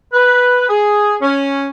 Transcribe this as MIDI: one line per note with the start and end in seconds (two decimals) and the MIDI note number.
0.13 0.68 71
0.68 1.15 68
1.22 1.66 61